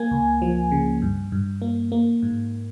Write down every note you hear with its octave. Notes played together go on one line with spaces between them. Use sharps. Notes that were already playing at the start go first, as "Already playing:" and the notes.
Already playing: A#3 G#5
C#2
F3
C#3
G2
G2
A#3
A#3
G#2